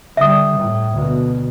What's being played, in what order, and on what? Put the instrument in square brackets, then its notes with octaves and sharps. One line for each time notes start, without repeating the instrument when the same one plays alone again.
[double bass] D3 G3 [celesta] E5 D#6
[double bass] A2
D2 B2